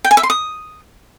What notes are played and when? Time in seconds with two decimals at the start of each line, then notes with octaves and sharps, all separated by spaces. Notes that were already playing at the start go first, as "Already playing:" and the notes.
0.04 G5
0.11 G#5
0.17 E5
0.23 C6
0.30 D#6